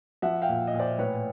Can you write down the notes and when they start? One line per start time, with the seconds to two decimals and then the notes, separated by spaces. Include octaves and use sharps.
0.22 F3 E5 F#5
0.42 F5 G5
0.49 A#2
0.67 D#5
0.74 A#2
0.79 C5 D5
0.98 A2 B4 C#5